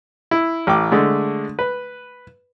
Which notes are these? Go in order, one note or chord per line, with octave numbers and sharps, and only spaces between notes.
E4
A1 G5 D6
D3 G#3 A3
B4